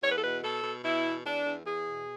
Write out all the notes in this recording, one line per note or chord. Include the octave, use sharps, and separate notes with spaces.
E2 C#5
B4
A4
B2 B4
B2 A4
B2
B2 E4
E2
E2 D4
E2
E2 G#4
B2